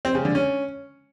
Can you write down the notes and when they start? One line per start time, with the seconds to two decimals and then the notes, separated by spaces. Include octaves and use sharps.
0.05 C4
0.15 C#3
0.25 D3
0.35 C#4